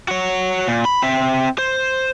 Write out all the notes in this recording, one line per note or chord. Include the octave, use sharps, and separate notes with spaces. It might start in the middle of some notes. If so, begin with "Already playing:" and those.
F#4 C#5
A#2
B5
C4 E5
C5